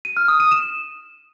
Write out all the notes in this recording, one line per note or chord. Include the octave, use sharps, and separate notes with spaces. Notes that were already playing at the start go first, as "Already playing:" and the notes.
D#7
F6
D#6
D#7
E7